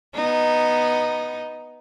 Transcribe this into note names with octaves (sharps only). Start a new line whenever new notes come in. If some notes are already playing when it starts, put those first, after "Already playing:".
B3 D#4